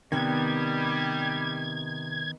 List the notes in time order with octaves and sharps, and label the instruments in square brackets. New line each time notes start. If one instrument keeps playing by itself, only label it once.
[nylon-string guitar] C3 [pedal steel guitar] D#3 B3 [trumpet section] G3 [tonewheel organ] G#6